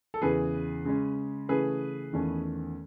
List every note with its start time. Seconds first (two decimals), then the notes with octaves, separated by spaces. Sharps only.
0.14 A4
0.22 E2 C#3 E3 G#4 B4
0.85 C#3 G#3 C#4
1.49 C#3 E3 A3 C#4 G#4 B4
2.13 E2 D#3 A3 C#4